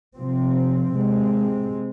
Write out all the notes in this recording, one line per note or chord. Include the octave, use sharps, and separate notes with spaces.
C3 F3 C4
C3 G#3 C4